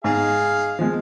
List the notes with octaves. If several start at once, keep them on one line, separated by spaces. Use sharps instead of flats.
G#2 G#4 F5
F3 G#3